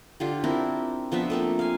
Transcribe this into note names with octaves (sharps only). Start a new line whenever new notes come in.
D3 F4 G4
C4 D4 E4 A#4
F3 B3 D4 E5
A3 A#3 C4
F5 G#5